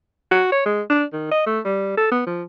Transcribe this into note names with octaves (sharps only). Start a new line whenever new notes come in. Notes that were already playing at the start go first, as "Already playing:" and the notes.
F#4
C#5
G#3
D4
D#3
D#5
A3
G3
A4
B3
F3